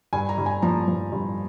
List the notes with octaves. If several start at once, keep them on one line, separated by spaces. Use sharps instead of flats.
G2 G#5
A#5
G2
G#5
F3 A#5
F3
G2